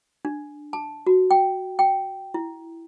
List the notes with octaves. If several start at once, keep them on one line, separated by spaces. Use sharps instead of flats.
D4
A5
F#4
G5
G5
E4